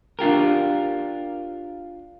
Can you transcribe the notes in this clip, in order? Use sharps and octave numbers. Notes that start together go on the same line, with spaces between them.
D4 F4 G4 A#4